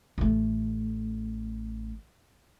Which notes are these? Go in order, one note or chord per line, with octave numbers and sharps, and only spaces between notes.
A1 A3